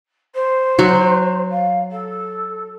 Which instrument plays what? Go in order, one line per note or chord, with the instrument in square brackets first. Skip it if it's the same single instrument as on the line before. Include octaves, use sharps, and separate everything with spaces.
[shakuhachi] C5
[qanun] F#3 F#4
[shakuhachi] F5
A4